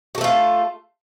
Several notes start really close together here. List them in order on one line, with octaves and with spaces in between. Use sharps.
F#4 A4 A3 F4